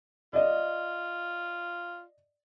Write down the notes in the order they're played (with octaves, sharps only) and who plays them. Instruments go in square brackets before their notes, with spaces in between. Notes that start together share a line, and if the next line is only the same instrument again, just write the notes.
[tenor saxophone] F4 [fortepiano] D5 D#5